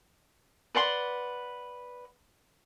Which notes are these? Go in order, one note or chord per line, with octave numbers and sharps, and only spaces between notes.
B4 D5 F#5 C6